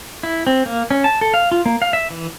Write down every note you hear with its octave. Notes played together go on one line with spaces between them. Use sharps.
E4
C4
A#3
C#4
A5
A4
F5
F4
A#3
F5
E5
E3